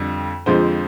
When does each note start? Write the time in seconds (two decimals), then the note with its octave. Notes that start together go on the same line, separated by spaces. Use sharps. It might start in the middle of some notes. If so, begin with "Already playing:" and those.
Already playing: F2 D3 G3
0.46 F2 D3 F3 G#3 C5